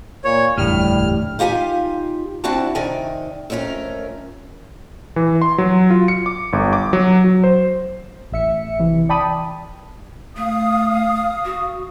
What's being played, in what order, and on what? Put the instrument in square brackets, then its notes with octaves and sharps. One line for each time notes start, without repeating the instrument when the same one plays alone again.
[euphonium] A#2 [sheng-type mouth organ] C#5
[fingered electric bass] F#1 E2 D3 [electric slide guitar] A2 [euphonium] G3 [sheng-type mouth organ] F6
[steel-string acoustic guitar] D#4 F4 G4 F#5 G#5
C4 D4 E4 F#4 F#5 A5
C3 D#3 D5 G5 G#5
F2 A3 C#4 F#4 A#4
[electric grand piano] E3
C6
F#3
F4
C#7
D6
G1
D6
F#3
F#3
C5
[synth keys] A1 E5 C#7
C3 E3
D5 G5 A5 B5 D#6
[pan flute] A3 [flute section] F5 D#6
[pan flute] F#4